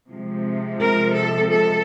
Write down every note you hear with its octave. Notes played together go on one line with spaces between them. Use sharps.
C3 F3 G#3
A#4
A4
A4